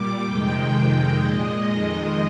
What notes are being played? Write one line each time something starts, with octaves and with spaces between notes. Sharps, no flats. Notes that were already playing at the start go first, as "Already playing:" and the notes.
Already playing: A#2 G3 D6
F2 C3 D#3 G#3 G5
F2 C3 D#3 G#3
A#2 G#3 D#5
F2 D#3 G#3 D#5